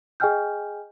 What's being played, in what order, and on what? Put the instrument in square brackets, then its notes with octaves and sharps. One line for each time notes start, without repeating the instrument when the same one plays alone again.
[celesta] G#4 D#5 G5 G#5 F6 G6